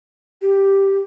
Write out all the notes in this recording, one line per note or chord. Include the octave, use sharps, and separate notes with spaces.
G4